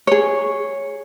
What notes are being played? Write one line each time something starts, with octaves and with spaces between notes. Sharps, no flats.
G#4 C#5